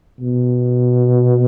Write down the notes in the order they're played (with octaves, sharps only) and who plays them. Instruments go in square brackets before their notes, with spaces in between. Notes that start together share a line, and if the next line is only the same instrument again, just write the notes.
[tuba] B2